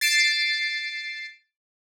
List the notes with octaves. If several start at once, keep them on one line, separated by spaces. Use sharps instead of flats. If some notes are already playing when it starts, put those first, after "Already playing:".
A6 C7 D7 E7